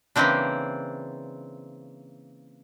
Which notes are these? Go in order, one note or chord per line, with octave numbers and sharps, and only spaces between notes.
C#3 E3 A#3 C4 D4